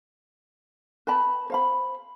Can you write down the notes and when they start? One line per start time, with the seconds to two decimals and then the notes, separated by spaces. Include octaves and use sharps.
1.07 B4 G5 A5 B5
1.50 C5 F5 B5